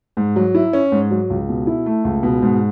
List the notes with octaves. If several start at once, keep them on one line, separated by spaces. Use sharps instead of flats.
G#2
F#3
E4
C#4
G#2
F#3
C#2
B2
E4
A3
C#2
B2
G#2